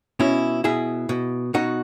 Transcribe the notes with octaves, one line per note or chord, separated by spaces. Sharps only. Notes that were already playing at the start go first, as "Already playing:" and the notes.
B2 C#4 E4
B2 E4 G#4
B2
B2 D#4 F#4